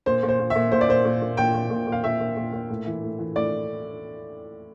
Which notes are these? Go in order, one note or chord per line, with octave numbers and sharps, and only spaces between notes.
A#2 C5
A#2
C5
A#2
E5
A#2
A#2 C5
D5
A#2 C5
A#2
A#2
A#2 G5
A#2
A#2
A#2
F5
A#2 E5
A#2
A#2
A#2
A2
E3
A2
E3
A2 D5